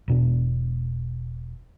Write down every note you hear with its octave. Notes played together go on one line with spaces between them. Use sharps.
E1 B2 D4